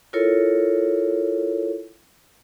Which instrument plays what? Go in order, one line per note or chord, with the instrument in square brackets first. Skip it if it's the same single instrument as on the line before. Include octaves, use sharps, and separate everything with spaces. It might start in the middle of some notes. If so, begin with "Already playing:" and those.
[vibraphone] E4 F4 A4 A#4 C#5